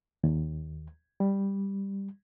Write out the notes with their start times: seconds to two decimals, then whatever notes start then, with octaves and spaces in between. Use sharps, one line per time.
0.24 D#2
1.20 G3